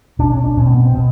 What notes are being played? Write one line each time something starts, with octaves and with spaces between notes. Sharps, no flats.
B2 D4
C#4
D4
B2 C#4
C4
A#3
B3
C4
B2